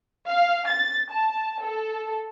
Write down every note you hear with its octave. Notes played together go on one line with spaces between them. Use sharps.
F5
A6
A5
A4